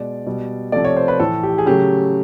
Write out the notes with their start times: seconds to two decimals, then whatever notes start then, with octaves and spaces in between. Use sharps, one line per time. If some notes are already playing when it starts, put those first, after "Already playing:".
Already playing: B2 G#3 D5
0.26 B2 G3
0.72 C3 F3 A3 D5
0.85 C#5
0.97 C5
1.08 B4
1.20 A2 E3 A3 A4
1.43 G4
1.58 G#4
1.66 C#3 F#3 A3 G4